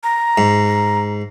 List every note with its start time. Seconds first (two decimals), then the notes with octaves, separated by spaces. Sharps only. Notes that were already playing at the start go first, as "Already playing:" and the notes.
0.04 A#5
0.38 G#2